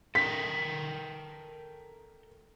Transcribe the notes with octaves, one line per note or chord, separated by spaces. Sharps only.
A4 A#4 G5 B6